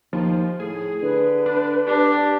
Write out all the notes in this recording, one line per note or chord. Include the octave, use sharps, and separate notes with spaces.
D#2 F3
A2 G#4
D3 B4
D4
D4 G4